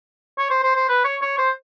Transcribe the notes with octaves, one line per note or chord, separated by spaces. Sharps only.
C#5
C5
C5
C5
B4
C#5
C#5
C5